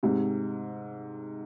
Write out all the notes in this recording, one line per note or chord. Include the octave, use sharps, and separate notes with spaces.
G#2 C3